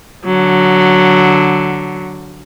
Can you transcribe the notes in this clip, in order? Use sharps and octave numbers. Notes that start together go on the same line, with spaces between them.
D3 F#3